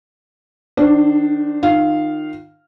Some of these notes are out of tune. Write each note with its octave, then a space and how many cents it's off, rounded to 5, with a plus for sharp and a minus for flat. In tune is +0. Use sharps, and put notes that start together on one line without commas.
D#3 -30 D4 +0 C5 +0
D#3 -30 F4 +0 F5 -10